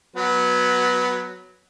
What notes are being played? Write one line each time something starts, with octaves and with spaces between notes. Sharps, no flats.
F#3 B3